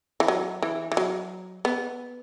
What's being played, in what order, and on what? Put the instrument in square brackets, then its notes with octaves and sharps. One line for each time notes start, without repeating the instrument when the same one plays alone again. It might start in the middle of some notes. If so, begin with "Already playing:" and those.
[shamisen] E3
F#3
E3
E3
F#3
B3